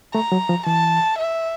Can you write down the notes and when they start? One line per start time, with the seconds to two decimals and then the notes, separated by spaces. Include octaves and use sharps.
0.14 A3 A#5
0.32 F#3
0.49 F3
0.66 E3 A5
1.18 E5